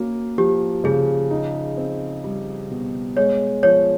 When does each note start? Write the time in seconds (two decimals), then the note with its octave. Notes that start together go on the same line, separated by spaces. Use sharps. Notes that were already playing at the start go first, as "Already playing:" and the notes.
Already playing: A#3 C#4 F#4
0.38 F3 G4
0.84 C#3 G#4
1.31 D#4
1.77 C4
2.24 G3
2.71 B2
3.17 G#3 C#5
3.63 F3 C#5